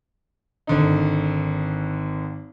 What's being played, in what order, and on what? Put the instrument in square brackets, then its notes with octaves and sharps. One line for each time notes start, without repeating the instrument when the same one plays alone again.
[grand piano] G#1 D3 D#4